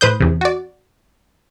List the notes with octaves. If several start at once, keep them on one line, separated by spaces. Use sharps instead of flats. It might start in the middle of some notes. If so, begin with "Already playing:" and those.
A2 B4 C5 D#6 G6
E2 C3
F#4 D5